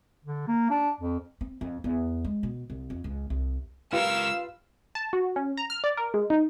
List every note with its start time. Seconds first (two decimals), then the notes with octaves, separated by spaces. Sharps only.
0.25 D3
0.48 A#3
0.70 D4
1.01 F2
1.41 C4
1.61 F2
1.84 E2
2.24 G#3
2.43 B2
2.70 C2
2.90 F2
3.04 C#2
3.30 C2
3.93 C#2 F4 G4 A#4 B4 F5 E6
4.95 A5
5.13 F#4
5.36 C#4
5.57 A#5
5.70 F6
5.84 D5
5.97 A#4
6.14 G#3
6.30 D#4